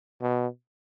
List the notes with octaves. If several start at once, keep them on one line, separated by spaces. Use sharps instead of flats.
B2